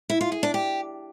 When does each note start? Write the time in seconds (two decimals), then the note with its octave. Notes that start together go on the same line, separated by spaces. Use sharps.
0.10 E4
0.21 F4
0.32 G#4
0.43 D4
0.54 G4